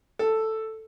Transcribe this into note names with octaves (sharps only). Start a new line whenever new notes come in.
A4